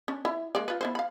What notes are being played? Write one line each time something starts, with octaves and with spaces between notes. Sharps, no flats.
C#4 D4
E4 E5
G#3 A#3 D5
F4 B4
B3 E4 C5
F5 B5